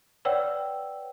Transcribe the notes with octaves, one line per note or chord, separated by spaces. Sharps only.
B4 C#5 D5 F#5 G5 E6